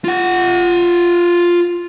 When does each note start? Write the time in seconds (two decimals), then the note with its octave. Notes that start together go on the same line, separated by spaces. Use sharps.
0.04 F4 F#5